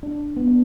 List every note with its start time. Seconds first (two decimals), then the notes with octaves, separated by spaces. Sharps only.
0.03 D4
0.37 B3
0.48 D4